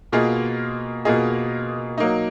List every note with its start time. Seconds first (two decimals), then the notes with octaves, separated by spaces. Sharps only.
0.12 B2 A#3 F4 G#4 D#5
1.05 B2 A#3 F4 G#4 D#5
1.98 F#3 A#3 D#4